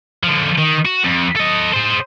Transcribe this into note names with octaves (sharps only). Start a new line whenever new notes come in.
D3 F3
D#3
F#4
F2
A4 D#5
G#4 C5